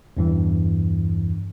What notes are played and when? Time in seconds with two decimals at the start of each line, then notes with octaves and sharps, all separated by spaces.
0.17 E2 G2 E3